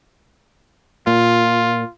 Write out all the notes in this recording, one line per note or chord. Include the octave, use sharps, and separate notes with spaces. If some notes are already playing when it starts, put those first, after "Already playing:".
A#2 F4